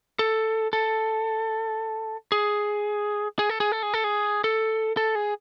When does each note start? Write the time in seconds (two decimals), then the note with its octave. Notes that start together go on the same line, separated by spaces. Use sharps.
0.19 A4
0.73 A4
2.32 G#4
3.39 G#4
3.50 A4
3.60 G#4
3.72 A4
3.83 G#4
3.94 A4
4.04 G#4
4.44 A4
4.97 A4
5.15 G#4